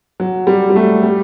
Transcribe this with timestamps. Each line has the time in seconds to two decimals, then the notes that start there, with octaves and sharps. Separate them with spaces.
0.20 F#3
0.47 G3
0.70 G3
0.76 A3
1.03 G3